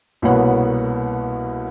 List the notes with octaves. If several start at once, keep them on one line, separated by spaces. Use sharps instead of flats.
C2 B2 A#3 B3 C#5 F#5